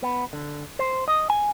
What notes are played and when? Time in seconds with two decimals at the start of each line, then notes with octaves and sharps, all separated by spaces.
0.02 B3
0.33 D3
0.79 C5
1.08 D#5
1.30 G#5